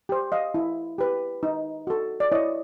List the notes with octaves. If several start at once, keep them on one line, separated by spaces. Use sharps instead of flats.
G4 C5
D#5 F5
E4
G4 B4
D#4
F#4 A4
D5
E4 C#5 D#5